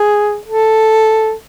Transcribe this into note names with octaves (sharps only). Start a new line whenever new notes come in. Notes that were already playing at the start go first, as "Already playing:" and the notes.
Already playing: G#4
A4